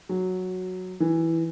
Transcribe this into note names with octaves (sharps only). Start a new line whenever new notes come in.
F#3
E3